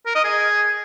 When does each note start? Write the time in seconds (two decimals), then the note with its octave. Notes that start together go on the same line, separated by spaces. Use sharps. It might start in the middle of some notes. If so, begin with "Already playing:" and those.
0.06 A#4
0.15 D#5
0.24 G#4